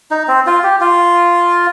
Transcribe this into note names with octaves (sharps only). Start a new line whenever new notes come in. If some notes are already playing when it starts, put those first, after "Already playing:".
D#4
C4
F4
G4
F4